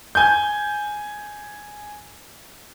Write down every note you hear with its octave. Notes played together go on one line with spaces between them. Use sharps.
G#5 G6